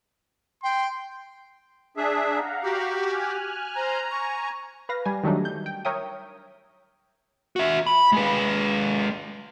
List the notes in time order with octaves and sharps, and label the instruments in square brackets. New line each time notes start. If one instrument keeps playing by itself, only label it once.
[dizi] G5 [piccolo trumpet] C6
[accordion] D4 G#4 E5
[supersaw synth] F5 F#5 A#5
[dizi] F#4 [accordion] G4
[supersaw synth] G#5 F6 F#6
[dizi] C5 [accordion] A#5
[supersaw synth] G#5 [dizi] C#6
[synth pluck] B4 F5 A#6
G3 G#5
D#3 F#3 G3 A3 D4 D#4
G6
G5
A#4 C#5 E5 G5 D#6
[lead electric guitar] F#4 E5
B5
G#3 B4